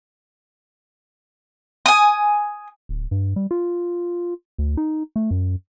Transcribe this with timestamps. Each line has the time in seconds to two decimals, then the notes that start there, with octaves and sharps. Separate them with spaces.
1.86 G#5 D#6
2.89 D1
3.11 G2
3.36 G3
3.51 F4
4.58 D2
4.77 D#4
5.16 A3
5.31 F#2